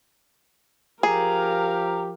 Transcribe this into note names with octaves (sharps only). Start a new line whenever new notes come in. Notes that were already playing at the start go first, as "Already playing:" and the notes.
F3 G4 G#4 A#4 F5 A#5